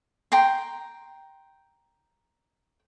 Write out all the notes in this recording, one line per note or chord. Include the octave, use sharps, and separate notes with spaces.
G5 A#5 C6